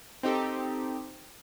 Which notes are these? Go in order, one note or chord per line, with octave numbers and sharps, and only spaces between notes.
C4 D#4 G4 A4